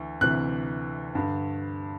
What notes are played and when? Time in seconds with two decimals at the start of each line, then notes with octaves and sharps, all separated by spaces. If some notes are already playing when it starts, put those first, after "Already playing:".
Already playing: D2 E3
0.21 D2 C3 E3 F#6
1.15 G2 D3